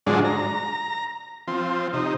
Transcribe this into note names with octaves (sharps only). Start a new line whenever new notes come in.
G#2 D3 F3 F#3 G#3 D4
A#5
F3 C4
C3 D#4